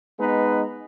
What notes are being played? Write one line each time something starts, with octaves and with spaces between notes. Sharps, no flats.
G#3 B3 D#4 B4